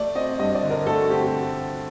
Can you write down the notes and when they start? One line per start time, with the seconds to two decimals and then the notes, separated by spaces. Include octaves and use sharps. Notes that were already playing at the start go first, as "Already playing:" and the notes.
Already playing: A3 D5
0.15 C4 D#5
0.39 G2 D#5
0.55 D5
0.63 D3
0.71 A#4
0.87 A3 A4
1.02 F#4
1.10 C4 G4